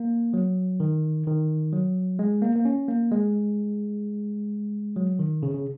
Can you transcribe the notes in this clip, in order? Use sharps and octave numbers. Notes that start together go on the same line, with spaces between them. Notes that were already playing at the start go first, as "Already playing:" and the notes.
Already playing: A#3
F#3
D#3
D#3
F#3
G#3
A#3
A#3
C#4
A#3
G#3
F#3
D#3
C#3
C#3